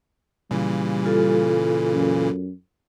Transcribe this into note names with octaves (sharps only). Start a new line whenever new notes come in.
A#2 C#3 E3 G3
F4 A4
F#2